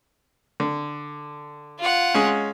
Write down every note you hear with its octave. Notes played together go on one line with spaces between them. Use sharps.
D3
F4 F#5
G#3 C#4